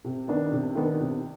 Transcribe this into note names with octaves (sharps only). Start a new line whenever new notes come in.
C3
D#3 B3 D4
C3
D#3 B3 D4
C3